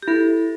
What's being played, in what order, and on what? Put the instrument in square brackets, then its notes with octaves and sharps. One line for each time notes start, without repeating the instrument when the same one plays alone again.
[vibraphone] G4
[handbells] E4 [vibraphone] A4